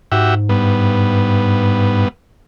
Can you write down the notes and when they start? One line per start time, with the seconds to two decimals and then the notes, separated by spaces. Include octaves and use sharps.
0.12 G#2 F#4 G4 E5
0.49 G2 B3